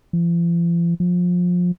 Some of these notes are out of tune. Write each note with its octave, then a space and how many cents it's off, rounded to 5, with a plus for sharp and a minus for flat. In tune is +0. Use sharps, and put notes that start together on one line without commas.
F3 -45
F3 +25